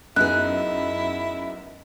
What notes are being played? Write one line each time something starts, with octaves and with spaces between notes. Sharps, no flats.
F#2 B3 D#4 E4 G#4 F#6